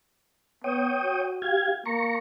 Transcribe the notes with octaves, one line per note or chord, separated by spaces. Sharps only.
B3 C#5 G5 D#6
F#4
G4 F5 G#6
A#3 A#5 C#6